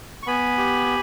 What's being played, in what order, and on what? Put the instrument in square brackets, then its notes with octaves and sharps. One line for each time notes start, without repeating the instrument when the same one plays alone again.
[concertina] C#6
B3 G#5 B5
G4